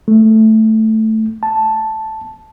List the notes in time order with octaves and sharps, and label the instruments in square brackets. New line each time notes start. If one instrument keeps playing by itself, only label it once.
[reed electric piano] A3
A5